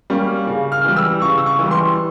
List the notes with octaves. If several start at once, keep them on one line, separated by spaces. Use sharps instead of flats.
G3 A#3 C#4
C#3
F6
E3 G3
E6
C#3 C#6
E6
C#6
E3 G3
C6